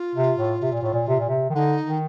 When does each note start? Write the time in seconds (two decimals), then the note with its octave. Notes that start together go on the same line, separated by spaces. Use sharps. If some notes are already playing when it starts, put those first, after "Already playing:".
Already playing: F4
0.15 C3
0.38 A2
0.62 C3
0.72 A#2
0.82 A2
0.94 A#2
1.08 C3
1.19 A#2
1.29 C3
1.50 D#3
1.55 D3 D#4
1.86 D#3